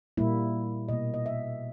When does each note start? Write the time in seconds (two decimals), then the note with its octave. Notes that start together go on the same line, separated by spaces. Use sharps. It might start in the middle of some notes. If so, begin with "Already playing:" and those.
0.17 A#2 G3 A#3 E4
0.89 B2 A#3 D#5
1.14 D#5
1.26 E5